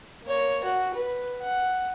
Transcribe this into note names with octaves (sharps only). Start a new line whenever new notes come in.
A#3 C#5
F#4
B4
F#5